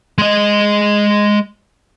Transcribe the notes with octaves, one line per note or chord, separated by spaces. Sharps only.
G#3 D#5